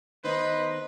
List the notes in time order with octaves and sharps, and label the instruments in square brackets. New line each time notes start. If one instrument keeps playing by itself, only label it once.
[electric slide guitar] D#3 B3 D#4 [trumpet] B4 [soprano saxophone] C5 [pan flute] D#5